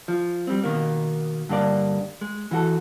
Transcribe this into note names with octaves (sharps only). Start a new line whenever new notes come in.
F3
G3 C4
B2 D#3 A#3
G2 D3 A#3 D5
G#3
E3 F#4 A4